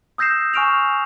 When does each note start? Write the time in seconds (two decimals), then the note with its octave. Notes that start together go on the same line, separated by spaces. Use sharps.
0.18 D#6 E6 G6 A#6 C7 E7
0.54 G#5 C#6 F6 D7 E7 F7